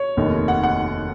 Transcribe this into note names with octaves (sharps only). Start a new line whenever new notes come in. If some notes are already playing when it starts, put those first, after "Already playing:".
Already playing: C#5
F1 D#2 D#3
F#5
F#5